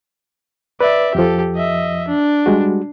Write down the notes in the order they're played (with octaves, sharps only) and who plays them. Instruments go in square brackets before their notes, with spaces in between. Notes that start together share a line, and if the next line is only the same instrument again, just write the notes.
[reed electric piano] B4 [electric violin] D5 E5
[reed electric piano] F2 F3 [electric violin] G4 A4
[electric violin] D#5 E5
D4
[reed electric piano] G3 G#3 F#4